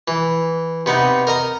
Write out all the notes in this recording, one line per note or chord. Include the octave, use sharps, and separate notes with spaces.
E3
C3 B3 D#4
A#4 D#5 A#5